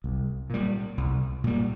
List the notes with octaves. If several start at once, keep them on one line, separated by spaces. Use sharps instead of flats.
C2
A#2 G3
C2
A#2 G3